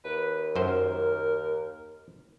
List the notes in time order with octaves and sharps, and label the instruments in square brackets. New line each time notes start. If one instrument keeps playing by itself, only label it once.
[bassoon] D#2 [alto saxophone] B4
[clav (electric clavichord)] F#2 C5 [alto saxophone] A#4